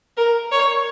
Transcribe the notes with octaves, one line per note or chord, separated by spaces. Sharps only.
A#4
C#5